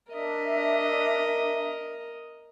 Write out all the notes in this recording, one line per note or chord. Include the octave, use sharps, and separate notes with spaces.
D4 A#4 D#5 E5